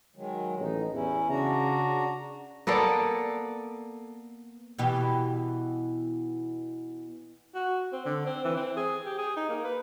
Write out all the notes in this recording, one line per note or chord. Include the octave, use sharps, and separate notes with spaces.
D#3 F#3 G#3
A1 D#4
E2 C#4 E4
C#3 D4 F#4 A#5
A#3 B3 A4 D5
B2 E3 G4
F#4
C4
D3
C4
E3
C4
G#4
G4
G#4
D#4
A#3
B4